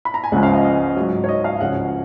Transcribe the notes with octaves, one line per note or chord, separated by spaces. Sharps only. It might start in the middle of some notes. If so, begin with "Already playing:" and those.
B5
A#5
G#5
C#2 C#3 F3 G#3 F#5
F5
D#5
D#5
G#2 F#3
C#5
D#5
F5
C#2 C#3 F3 F#5